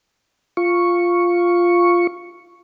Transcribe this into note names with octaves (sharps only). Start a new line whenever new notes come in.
F4 C#6